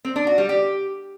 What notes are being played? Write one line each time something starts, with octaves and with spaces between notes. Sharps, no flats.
C4
D4
F#4
G3
G4